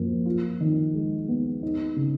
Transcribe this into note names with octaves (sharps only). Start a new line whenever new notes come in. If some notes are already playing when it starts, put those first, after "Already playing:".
Already playing: F#2 F3 A#3
F4
D#3
G#3
B3
D#4
C#3